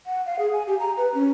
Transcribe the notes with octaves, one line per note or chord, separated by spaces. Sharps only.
F#5
F5
G#4
G#5
G4
A#5
B4
C#4